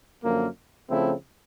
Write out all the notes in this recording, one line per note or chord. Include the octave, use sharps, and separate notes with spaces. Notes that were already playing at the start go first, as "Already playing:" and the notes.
F#2 D3 F3 A#3
C#3 F3 A3 C4 E4